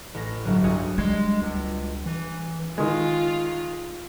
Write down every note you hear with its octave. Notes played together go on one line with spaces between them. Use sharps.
A1 A#6
G1 F#3
B1 D4 F#4 G#4
G3 G#3 G#6 C7
C#2
E3
D#3 G#3 F4